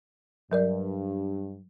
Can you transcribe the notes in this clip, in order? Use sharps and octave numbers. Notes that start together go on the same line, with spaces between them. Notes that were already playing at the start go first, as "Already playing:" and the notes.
G2 F#3 A#4 D5